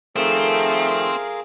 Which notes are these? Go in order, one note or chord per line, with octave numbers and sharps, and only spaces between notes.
D#3 F3 A3 C4 G#4 A#4 F5